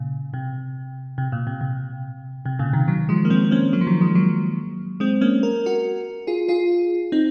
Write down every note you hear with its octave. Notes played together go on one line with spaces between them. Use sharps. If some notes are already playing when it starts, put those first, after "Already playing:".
Already playing: A#2 C#3
C3
C3
A#2
C3
C3
C3
A#2 C#3
C3 D#3
D#3 F#3
F3 G#3
A#3
G#3 C4
C4
A#3 C#4
F#3 A#3
F3
D#3 F#3
F3 G#3
F#3 A#3
G#3 C4
A#3 C#4
A#4
F#4 A#4
F4 G#4
F4 G#4
C4 D#4